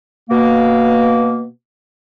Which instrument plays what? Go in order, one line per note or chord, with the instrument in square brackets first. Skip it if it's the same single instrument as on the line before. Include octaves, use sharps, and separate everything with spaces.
[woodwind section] B2 A#3